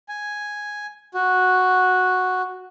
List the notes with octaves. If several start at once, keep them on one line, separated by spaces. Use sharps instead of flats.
G#5
F#4